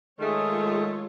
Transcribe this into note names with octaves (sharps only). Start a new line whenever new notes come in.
D#3 G#3 A3 F4 G#4 C#5